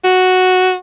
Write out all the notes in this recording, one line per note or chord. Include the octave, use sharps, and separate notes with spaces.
F#4